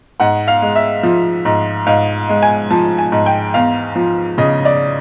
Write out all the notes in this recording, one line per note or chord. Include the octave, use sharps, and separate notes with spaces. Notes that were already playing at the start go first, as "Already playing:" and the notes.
G#2 F#5
F5
G#3
E5
F3
G#2
G#2 F5
G#3
G#5
F3 A5
G#5
G#2
G5
E2 F5
F3
C#3 D#5
D5